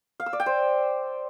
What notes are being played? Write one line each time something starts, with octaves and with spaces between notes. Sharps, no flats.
F5
E6
D5
G5
C5